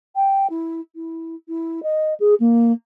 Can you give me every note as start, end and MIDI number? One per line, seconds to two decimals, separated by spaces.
0.15 0.46 79
0.50 0.80 64
0.95 1.35 64
1.48 1.82 64
1.83 2.14 75
2.20 2.34 68
2.40 2.72 58